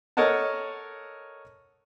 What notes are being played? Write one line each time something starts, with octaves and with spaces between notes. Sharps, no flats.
A4 A#4 C#5 D#5 F#5 A5